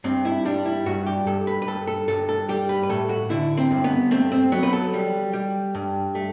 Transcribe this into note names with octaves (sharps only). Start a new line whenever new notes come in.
G2 C4
E4
G3 D4
E4
G2 F#4
G4
G2 A4
B4
B4
G2 A4
A4
G2 A4
A4
G3 G4
B4
B4
A2 A4
F#4
D3 E4
C4
G2
B3
A3 C4
C4
F#3 B3
B4
A4
G3
G3
G2
A3